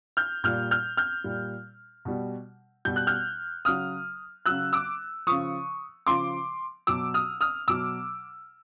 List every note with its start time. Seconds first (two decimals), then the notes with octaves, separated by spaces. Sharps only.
0.17 F6 G6
0.44 A#2 G3 F6 G6
0.71 F6 G6
0.97 F6 G6
1.24 A#2 G3
2.05 B2 G3
2.85 B2 G3 G6
2.96 F#6
3.07 F6 G6
3.65 C#3 F#3 D#6 F6
4.46 C#3 F#3 E6 F#6
4.73 D6 E6
5.27 C#3 F3 C#6 D#6
6.07 C#3 F3 C6 D6
6.87 B2 F#3 D6 E6
7.14 D#6 F6
7.41 D#6 F6
7.68 B2 F#3 D6 E6